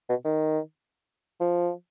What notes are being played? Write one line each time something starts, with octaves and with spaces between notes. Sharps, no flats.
B2
D#3
F3